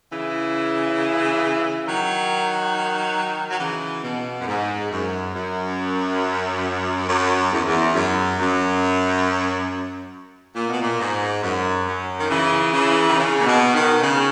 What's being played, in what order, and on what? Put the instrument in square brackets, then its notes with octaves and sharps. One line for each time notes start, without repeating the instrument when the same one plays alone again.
[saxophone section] C#3 E3
D#3 F#3
F#3
C#3 E3
B2
F#2
G#2
F#2
F#2
F#2
E2
E2
F#2
F#2
A#2
B2
A#2
G#2
F#2
F#2
D#3
C#3 E3
C#3 E3
D#3
C#3
A#2
B2
B2 D#3
C#3